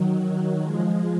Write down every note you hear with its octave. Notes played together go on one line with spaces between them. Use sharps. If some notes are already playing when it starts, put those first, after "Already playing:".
Already playing: D#3 F#3
D#3 F#3
F3 G#3